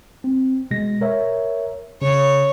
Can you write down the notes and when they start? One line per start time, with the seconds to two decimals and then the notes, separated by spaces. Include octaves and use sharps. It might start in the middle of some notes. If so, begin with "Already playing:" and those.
0.24 C4
0.71 B2 G#3 A#6
1.01 A#4 C#5 E5
2.02 C#3 C#5